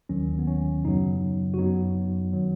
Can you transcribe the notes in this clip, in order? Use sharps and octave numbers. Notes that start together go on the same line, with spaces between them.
D#2 D#3 F#3 C#4
B3
C#4
F#2 C#3 F#3 B3 D#4
F#4
F#2 F#3 B3 D#4
D#3 F#3